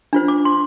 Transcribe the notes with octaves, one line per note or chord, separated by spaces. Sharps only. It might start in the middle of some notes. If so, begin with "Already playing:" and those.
D4 F4 C5
D6
C6